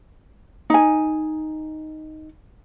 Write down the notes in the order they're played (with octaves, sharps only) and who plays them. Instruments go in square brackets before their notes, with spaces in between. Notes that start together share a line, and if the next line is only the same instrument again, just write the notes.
[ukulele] D#4 G#5